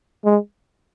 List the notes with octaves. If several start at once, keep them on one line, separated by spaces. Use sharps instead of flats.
G#3